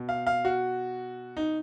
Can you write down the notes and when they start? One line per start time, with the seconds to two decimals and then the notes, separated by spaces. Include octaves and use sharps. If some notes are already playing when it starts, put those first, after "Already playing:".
Already playing: B2
0.09 F5
0.27 F5
0.45 F#4
1.37 D#4